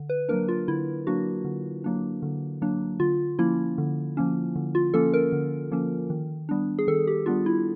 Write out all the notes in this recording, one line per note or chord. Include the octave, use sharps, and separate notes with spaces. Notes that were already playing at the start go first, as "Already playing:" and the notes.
Already playing: D3
B4
F#3 A#3 D4 A#4
F4
D3 E4
F#3 A#3 D4 F#4
D3
F#3 A#3 D4
D3
F#3 A#3 D4
D3 F4
F3 A#3 C#4 E4
D3
F3 A#3 C#4
D3
F4
F3 A#3 C#4 A4
A#4
D3
F3 A#3 C#4
D#3
G3 B3 D4
G#4
D#3 A4
G4
G3 B3 D4 F4
E4